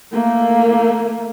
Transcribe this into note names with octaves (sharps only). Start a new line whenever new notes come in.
A3 A#3